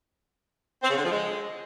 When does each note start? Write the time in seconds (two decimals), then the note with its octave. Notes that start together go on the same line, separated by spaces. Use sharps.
0.83 C4
0.90 C#3
0.97 D3
1.04 F3
1.11 G#3